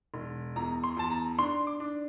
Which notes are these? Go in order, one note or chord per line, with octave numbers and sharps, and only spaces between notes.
E1
E2 A#5
C6
E2 A5
A#5
D4 C6
D6
D4